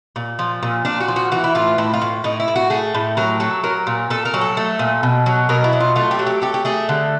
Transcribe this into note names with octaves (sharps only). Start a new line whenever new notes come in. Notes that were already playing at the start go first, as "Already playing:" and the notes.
A#2
F3
A#2
A#2 D4
F#4
F3
F#4
E3 F#4
E4
A2 F4
A2 E4
F4
A2
A2 D#4
E4
A2
F#4
A3 G#4
A2
F#3 A#4
F#3 A4
F#3 A#4
A#2
A#2 A4
A#4
F#3
A4
A3
A#2
B2
F#3
B2 A#4
E4
F#3
F4
A3 F4
G4
F#3
G4
A3 G4
G4
A3 G#4
D3